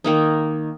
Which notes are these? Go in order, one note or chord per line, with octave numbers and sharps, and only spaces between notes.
D#3 A#3 D#4